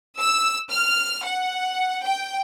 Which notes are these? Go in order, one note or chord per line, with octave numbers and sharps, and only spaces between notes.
E6
F6
F#5
G5